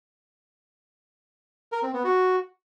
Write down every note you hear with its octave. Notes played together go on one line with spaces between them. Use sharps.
A#4
C4
B3
F#4